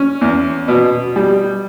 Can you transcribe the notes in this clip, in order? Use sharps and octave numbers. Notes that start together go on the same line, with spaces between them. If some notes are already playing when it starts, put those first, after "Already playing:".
Already playing: C#4
E2
B2
G3